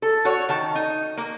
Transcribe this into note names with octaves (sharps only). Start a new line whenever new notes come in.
A4
F#4 C#5
D#3 A5
D#4
A#3